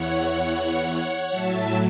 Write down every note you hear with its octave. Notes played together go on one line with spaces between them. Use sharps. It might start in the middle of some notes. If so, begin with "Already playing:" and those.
Already playing: E2 E3 C#5 F#5
A2 F#3 E5 A5